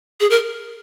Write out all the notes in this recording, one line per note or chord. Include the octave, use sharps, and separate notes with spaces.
G#4
A#4